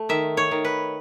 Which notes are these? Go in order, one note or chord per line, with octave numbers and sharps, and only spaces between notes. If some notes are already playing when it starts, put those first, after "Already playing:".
Already playing: A3
D#3 E5
C#5
D#3
B4